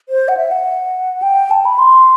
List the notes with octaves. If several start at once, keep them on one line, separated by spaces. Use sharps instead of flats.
C5
F#5
E5
F#5
G5
A5
B5
C6